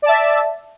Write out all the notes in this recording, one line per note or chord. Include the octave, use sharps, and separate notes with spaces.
D5 E5 A5